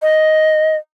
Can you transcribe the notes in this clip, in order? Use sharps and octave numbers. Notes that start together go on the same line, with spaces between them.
D#5